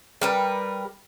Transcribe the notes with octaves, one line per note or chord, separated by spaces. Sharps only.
G3 A#4 B4